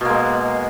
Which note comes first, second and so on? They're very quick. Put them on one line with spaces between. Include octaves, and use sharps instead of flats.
B2 A#3 G#3